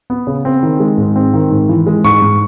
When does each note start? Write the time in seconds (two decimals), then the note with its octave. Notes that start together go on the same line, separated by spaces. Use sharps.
0.10 B3
0.27 C#3
0.45 C4
0.63 D#3
0.80 G#3
0.98 G#2
1.16 C4
1.34 D#3
1.51 G#2
1.69 E3
1.87 G#3
2.04 G#2 C#6
2.22 G#2